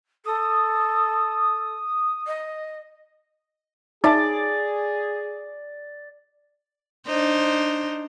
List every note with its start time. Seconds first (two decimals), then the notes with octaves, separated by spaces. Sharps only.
0.26 A4 D#6
2.27 D#5
4.04 D#4 G#4 D5 E5 A5
7.07 D4 D#4 C5